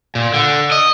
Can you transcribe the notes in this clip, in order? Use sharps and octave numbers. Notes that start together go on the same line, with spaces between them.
A#2
D3
D#5